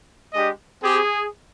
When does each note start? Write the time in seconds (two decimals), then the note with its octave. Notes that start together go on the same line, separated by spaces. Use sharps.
0.33 G#3 D4 G4 D#5
0.82 C4 G4 G#4